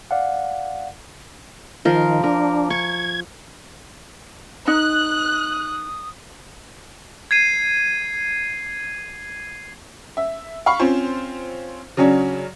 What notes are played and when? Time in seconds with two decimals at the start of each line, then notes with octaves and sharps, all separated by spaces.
0.11 D5 F5 F#5
1.85 D#3 F3 A#4
2.24 D4 A#4
2.70 C#6 G#6
4.68 D#4 D#6 F#6
7.31 G#6 C7 D#7
10.17 E5
10.66 F5 B5 C#6
10.80 C4 C#4 F4 C5
11.97 C#3 F#3 C#4 D4